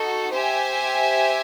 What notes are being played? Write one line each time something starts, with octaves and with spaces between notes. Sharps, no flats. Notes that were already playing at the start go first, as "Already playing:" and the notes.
Already playing: D#4 F#4 A4
G4 C5 E5 G#5